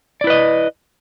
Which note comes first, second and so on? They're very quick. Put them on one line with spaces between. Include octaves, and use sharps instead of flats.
D5 E4 B4 D#5